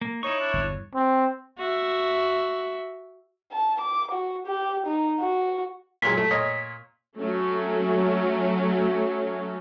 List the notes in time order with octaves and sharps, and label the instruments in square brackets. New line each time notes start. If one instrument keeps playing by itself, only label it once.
[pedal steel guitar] A#3
[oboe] D#4 [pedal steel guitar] E4 C#6 [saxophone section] C#5
[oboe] D4
[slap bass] G1 E2
[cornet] C4
[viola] F#4 E5
[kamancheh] A5
D6
F#4
G4
D#4
F#4
[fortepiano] A#2 F#3 G#3 [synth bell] B6
[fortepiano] A3
A#2 C#5 D#5
[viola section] F#3 A3 C#4